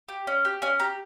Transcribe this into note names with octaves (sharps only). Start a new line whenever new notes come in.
G4
C#4
G4
C#4 G#5
G4 A#5